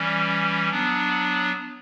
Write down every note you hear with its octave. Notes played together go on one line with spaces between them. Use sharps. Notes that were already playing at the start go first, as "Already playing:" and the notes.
Already playing: E3 G3 C#4
F#3 B3 D4